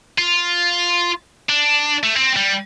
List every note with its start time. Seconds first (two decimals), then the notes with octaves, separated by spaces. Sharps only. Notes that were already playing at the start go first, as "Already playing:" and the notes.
0.18 F4
1.49 D4
2.03 A3
2.15 C4
2.36 G3